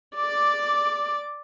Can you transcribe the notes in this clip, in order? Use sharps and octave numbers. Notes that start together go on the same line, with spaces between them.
D5 D6